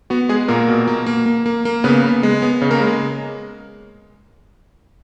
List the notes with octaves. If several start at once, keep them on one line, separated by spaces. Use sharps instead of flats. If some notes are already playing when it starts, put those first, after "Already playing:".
B3 F#4
G#3 G#4
A#2 A#3 A#4
B2
A#3
A#3
A#3
A#3
A#3
C#3 B3 B4
B3
G#3
B3
C#3
A#3 A#4
G#3